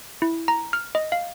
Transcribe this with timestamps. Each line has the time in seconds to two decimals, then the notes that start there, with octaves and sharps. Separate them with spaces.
0.22 E4
0.48 A#5
0.73 F6
0.95 D#5
1.12 F5